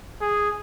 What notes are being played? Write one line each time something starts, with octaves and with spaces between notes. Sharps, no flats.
G#4